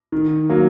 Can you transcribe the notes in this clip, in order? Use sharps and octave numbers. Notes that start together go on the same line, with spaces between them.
D#3
F#3 A#3